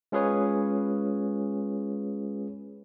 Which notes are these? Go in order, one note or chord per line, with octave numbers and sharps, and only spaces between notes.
G#3 C#4 F4 G#4 B4 C#5